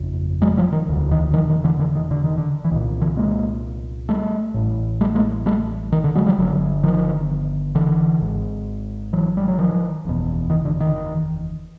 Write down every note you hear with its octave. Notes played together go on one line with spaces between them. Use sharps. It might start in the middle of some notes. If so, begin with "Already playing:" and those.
Already playing: G1 F2 C#3
F#3 G#3
F3 G3
D#3
E1 D2 D3
D#3
D#3 F3
D#3
D3 E3
D3 E3
D#3
D3
D#3
D3
E3
C2 A#2 D#3
D3 E3
G#3 A#3
G3 A3
A1 A2
G3 A3
G#3 A#3
G3 A3
D#3
D3
F#3 G#3
F3 G3
G1 G2 D3 F#3
D#3 F3
D3 E3
G#1 G#2
E3 F#3
G3
F#3
D#3 F3
F#1 E2 B2
D#3
D3
D#3